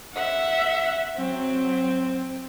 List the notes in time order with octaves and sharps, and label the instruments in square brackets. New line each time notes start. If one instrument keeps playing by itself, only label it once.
[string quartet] E5 [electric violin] F#5
[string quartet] F#3 [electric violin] C4